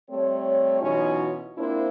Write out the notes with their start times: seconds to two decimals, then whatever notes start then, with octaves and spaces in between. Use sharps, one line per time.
0.10 G3 A3 C4 C#5
0.81 B2 E3 F#3 C#4 D#4 F4
1.58 A#3 C4 D4 E4 F4 C5